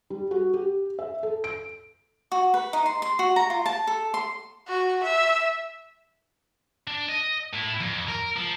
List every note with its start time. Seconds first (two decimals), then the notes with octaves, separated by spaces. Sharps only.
0.10 G3
0.31 F#4
0.54 G4
0.99 E5
1.23 A4
1.44 D7
2.32 F#4
2.54 B4
2.73 D#4
2.86 C6
3.02 C6
3.19 F#4
3.36 A#5
3.50 F4
3.66 A5
3.87 A4
4.14 C6
4.68 F#4
5.03 E5
6.87 D4
7.09 D#5
7.53 A2 E4
7.80 F2
8.08 A#4
8.37 F3